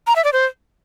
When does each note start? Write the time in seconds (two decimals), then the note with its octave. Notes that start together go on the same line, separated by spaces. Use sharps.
0.07 A#5
0.16 E5
0.24 D5
0.33 C5